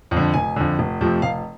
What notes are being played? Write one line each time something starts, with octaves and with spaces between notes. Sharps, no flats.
F2
D3
F1 G#5
F2 D3
F1
F2 C3 F3 A3
F1 F5